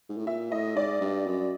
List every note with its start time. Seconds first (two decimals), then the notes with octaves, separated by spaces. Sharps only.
0.09 G#2
0.17 A2
0.26 A#2 E5
0.51 A2 D#5
0.76 G#2 D5
1.01 G2
1.26 F#2